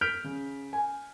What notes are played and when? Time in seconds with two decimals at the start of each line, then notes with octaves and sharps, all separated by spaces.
0.01 F6 G6 B6 D7 F7
0.24 C#3
0.73 G#5